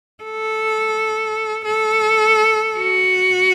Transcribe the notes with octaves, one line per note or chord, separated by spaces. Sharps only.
A4
A4
F#4